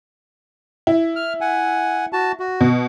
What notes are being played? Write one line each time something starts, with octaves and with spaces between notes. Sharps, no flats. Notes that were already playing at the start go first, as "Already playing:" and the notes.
E4
F6
F#5 G#5
F#4 A5
F#4
B2